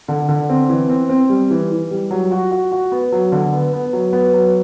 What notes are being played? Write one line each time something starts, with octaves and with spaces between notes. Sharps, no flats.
D3
D3
C4
E3
C4
C4
G3
E3
E3
G3
F#3
F#4
F#4
F#4
B3
F#3
D3
B3
B3
F#3
B3
F#3